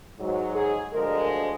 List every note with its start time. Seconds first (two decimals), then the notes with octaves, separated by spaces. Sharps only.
0.18 G#2 F#3
0.55 G#4
0.93 D2 D3 F3 G#3 A#4